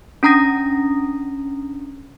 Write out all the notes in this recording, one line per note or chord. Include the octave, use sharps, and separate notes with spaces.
C#4 D4 A#5 D#6 A#6